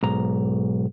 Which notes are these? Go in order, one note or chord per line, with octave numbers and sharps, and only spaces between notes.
B1 G#2 A#5